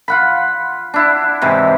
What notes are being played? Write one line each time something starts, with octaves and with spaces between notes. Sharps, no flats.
F4 F#5 B5
D4 E4
G#2 C3 E3